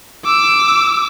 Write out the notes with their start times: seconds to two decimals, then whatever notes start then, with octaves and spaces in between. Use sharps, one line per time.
0.24 D6 E6